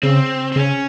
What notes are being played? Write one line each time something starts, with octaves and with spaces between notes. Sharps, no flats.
C#3 C4
C4
C#3 C#4